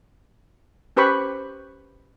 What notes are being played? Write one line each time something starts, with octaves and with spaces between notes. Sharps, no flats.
C#4 G4 B4 C5 B5 C#6